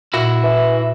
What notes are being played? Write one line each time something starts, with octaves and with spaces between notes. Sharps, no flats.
A#2 E4 F#4
E3